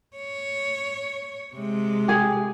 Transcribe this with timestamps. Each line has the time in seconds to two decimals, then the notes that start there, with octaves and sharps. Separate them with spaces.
0.17 C#5
1.55 C3 G#3
2.08 G4 G#4